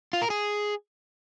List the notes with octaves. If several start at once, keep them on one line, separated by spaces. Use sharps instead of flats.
F4
A#4
G#4